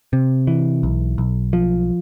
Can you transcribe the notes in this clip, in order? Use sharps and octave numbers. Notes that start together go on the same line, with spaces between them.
C3
E3
B1
B1
F3